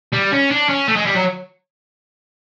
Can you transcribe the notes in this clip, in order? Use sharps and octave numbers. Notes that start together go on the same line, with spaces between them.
G3
C#4
D4
C#4
A3
G#3
G3
F#3